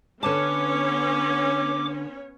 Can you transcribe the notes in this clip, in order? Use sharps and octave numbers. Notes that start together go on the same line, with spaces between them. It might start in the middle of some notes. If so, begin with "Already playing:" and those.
D3 B3 C#4 B4 C#5 A5 D6